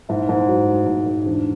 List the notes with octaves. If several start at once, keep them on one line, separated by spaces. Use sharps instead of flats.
G#2 E4
G#2
F#3
F#3
G#2
G#2
E2 D4